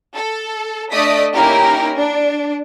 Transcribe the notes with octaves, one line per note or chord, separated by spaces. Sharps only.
A4
A3 D4 D5 D#5 D#6 B6
A#3 C#4 D#4 E4 G4 A#4
D4